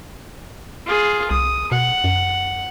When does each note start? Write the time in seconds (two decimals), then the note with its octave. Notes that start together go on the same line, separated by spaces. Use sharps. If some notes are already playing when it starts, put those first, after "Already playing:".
0.86 F4 G#4
1.31 C2 D#6
1.72 B2 F#5
2.04 F#2